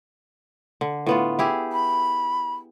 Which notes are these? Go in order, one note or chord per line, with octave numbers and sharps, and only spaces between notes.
D3
A2 B3 F4
E4 G4 G#4
B5